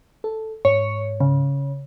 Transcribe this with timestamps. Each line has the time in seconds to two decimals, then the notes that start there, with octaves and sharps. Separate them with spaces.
0.24 A4
0.65 G#2 C#5
1.20 C#3